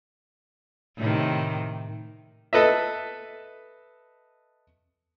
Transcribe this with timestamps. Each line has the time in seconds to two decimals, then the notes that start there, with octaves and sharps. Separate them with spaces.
0.98 A2 C3 D#3
2.53 A4 B4 D#5 E5